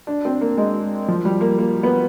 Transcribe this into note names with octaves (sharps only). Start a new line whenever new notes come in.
D4
C4
A#3
G#3
F3
G3
A#3
A#3
B3